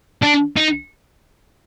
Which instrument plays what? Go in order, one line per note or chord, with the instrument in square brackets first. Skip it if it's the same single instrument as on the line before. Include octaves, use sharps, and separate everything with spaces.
[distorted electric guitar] D4
D#4